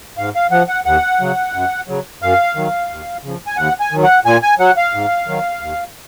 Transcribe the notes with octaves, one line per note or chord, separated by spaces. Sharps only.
G#2 F5
F5
F3 F#5
F#5
D#2 F#5
C#3 F#3
F#2
C#3 F#3
F#2 F5
D#3 F#3
D#2
C#3 F3
G#5
D#2 F#5
G#5
D#3 F#3
F#5
A#2 G#5
G#5
F#3 F#5
F5
G#2
D#3 F#3
D#2